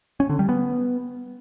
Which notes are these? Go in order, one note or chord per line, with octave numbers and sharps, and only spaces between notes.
C#4
D3
G3
B3